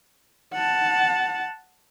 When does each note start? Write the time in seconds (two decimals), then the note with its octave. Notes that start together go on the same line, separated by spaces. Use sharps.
0.53 F#5 A5